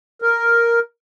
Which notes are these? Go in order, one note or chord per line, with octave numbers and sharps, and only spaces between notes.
A#4